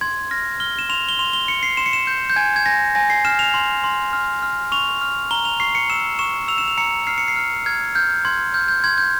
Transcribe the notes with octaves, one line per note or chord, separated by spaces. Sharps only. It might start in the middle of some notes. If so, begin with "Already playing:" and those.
C6 G#6
F6 A#6
F6 G7
E7
C6 F7
G7
C6 F7
G7
C6 C#7
C7
C6 E7
C#7
E7
G6
G6
G#5 G#6
G#6
G#5 A#6
G#5 A#6
C7
F6 E7
F7
C6
C6
F6
F6
C#6 F7
F6
A#5 G7
F7
C#6 C7
C#7
E6 E7
C#6 E7
E6 F7
E7
F7
A#5 C#7
F6 C7
C#7
C7
F6
F6 G#6
F6 G6
C6 G#6
F6 G6
G6
C6 G#6
G6